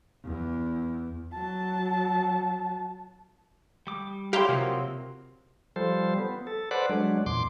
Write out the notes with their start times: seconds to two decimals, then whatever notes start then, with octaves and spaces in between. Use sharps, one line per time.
0.23 E2
1.33 F#3 A5
3.87 G3 D6
4.33 F#3 G3 E4 G4 F5 A#5 C6
4.49 C3 F3 F#3 A#3 C4
5.76 F3 G3 A4 C5
6.18 B3
6.47 A4
6.71 A4 B4 C5 D5 F#5
6.89 F#3 G#3 D4
7.26 E2 A#2 C6 D6